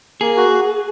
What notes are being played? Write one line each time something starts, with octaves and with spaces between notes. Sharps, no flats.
A#3 G#4
F#4